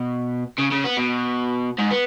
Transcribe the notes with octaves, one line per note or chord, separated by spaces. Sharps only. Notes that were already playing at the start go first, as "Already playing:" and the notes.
Already playing: B2
C#3
C#3
B3
B2
G#2
B3